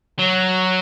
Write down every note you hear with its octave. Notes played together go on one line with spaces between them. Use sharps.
F#3